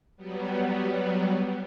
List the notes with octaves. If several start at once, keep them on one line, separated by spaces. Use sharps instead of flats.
F#3 G3 B3